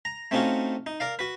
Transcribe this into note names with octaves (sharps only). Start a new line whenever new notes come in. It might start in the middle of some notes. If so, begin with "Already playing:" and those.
A#5
A3 C4 C#4 D#4 F4 F#4
D#4
A#4 D5 F5
F#4 B4